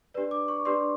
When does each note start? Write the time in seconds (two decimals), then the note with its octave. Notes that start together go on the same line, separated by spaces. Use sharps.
0.14 D4 G4 B4 D5
0.31 D6
0.48 C#6
0.65 D4 G4 B4 D5 C6